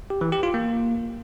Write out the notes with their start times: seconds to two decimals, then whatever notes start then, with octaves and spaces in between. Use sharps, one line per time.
0.10 G4
0.21 E3
0.32 G4
0.43 F4
0.54 A#3